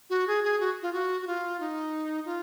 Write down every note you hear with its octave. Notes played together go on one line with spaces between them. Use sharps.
F#4
G#4
G#4
F#4
F4
F#4
F#4
F4
D#4
F4